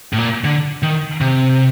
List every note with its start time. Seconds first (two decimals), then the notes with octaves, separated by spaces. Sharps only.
0.13 A2
0.18 A#2
0.44 D3
0.83 D#3
1.21 C3